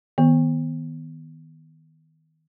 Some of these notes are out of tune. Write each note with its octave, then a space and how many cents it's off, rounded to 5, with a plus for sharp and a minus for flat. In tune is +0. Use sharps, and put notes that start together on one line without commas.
D#3 +20 B3 +0